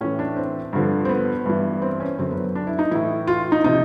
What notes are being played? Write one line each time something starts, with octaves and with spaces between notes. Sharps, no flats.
A2 E3 C#4
D4
C4
G2 D3 F3
C4
B3
G2 E3
C4
C#4
F#2 D3 F#3 C4
B3
D4
E4
D#4
A2 E3 E4
F4
D#4
C3 F3 D#4